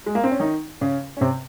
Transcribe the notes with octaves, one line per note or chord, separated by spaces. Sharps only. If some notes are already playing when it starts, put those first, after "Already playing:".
G#3
A#3
C4
C#4
D#3 D#4
C#3 C#4
C#4
C3 C4